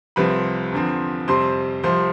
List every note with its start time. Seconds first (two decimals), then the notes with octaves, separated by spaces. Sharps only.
0.16 C2 C3 F3 C4 B4 B5
0.72 E2 D3 F3 C4
1.28 F2 C3 G3 C4 C5 C6
1.83 C2 C3 F3 C5 C6